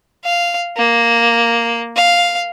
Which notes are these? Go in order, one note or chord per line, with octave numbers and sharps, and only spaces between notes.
F5
A#3
F5